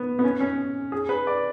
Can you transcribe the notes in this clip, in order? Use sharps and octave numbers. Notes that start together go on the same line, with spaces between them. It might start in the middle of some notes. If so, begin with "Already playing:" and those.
Already playing: B3
B3
C#4
C#4
G#4
B4
D5